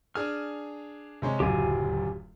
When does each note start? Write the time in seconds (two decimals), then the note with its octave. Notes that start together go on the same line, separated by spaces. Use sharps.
0.15 D4 G#4 G#5 F6
1.22 C3 G#3 C#4
1.40 D1 C#2 F#2 G4 G#5